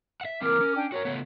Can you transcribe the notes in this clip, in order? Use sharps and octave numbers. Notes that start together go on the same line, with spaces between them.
E5 F#5
E3 A#3 C4 A#4 D6 F6
C#4
D4 G5
F#4 G#4 A#4 C#5
C#3 A3 B3